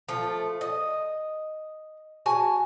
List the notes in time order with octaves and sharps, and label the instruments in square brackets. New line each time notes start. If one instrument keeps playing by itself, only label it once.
[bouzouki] F3 A3
D#5
F#4 G#5 A5